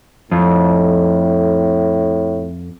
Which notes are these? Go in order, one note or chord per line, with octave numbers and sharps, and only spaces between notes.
F2 A2